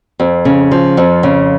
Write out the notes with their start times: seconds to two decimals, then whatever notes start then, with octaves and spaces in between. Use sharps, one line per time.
0.20 F2
0.45 C#3
0.71 F3
0.97 F2
1.23 C#3